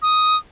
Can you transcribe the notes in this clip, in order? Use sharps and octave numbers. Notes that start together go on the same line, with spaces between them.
D#6